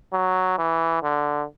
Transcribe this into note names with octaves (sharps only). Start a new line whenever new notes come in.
F#3
E3
D3